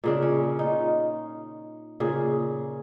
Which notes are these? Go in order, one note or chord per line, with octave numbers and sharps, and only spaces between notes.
A#2 C#3 D4
C#4
D#4 F4
A#2 C#3 G#4